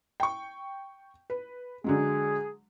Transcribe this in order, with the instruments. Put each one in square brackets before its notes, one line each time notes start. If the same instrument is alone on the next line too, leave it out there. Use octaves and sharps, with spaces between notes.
[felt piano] G5 C#6
B4
[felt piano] D3 F#3 G#3 [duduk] G#4